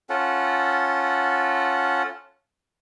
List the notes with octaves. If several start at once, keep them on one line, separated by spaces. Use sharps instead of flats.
C#4 F4 A4 F#5